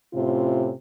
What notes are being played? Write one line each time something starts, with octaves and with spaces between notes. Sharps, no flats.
A2 C3 C#4 F4